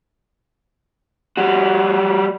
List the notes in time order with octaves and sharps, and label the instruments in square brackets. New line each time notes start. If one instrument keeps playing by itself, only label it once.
[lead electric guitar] G3 F#4